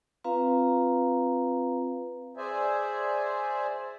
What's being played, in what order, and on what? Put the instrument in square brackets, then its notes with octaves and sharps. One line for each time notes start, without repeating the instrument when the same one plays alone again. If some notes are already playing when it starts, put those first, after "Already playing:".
[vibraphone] C4 F4 B4 F5 A#5
[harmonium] G#4 C5 D5 E5 G#5